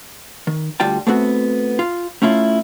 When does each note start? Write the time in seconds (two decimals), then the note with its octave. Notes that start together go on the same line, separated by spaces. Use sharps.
0.47 D#3
0.80 D2 G3 F4 G5 A5
1.07 A3 B3 C4 F#4
1.79 F4
2.22 A3 C#4 E4 F4